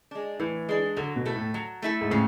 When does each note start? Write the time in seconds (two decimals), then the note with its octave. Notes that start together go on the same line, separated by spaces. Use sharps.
0.11 G#3 D4
0.40 A2 E3
0.69 G#3 D4
0.97 D3 F#3
1.16 B2
1.25 A3 E4 A4
1.35 A2
1.54 F#3
1.82 A3 E4 A4
2.01 G#2
2.11 A2 C#3